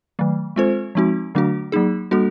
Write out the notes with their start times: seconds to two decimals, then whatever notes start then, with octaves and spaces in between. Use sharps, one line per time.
0.19 D#3 F#3 A3
0.56 G#3 C4 F4 A4 C5
0.95 F3 G#3 C4 D#4 F#4
1.35 D3 F#3 A3 D4 F#4
1.72 F#3 A#3 D#4 G#4
2.11 G3 A#3 D4 F#4 A4